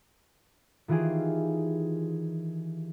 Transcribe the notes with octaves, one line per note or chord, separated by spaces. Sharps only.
D#3 E3 F4 G4 G#4